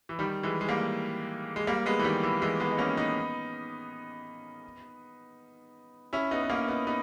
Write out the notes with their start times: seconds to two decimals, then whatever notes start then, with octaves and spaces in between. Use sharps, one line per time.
0.09 E3
0.19 D#3 G3
0.43 E3 G#3
0.61 G#3
0.68 G3 A#3
1.56 G#3
1.67 G3 A#3
1.86 G#3 B3
1.99 E3
2.04 D#3 G3
2.23 E3
2.42 E3 G#3
2.60 G#3 B3
2.71 D#4
2.78 A#3 C#4
2.97 B3 D#4
6.13 C#4 E4
6.31 B3 D#4
6.43 B3
6.50 A#3 C#4
6.68 B3 D#4
6.87 B3 D#4